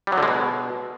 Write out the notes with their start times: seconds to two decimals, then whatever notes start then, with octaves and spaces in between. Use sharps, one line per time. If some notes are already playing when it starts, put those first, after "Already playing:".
0.07 G3
0.12 F#3
0.17 D3
0.23 G#3
0.28 B2